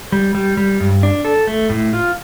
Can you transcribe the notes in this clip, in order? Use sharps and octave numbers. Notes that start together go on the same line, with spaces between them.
G3
G3
G3
G2
D4
A4
A3
A2
F4